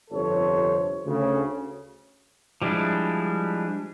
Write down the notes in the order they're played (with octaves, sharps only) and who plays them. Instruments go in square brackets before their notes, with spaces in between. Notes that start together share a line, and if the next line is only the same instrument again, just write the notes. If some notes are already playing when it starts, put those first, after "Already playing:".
[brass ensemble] G1 F2 C3 A4 C5 C#5
D2 C#3
[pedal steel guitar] F3 G3 G#3 D4 E4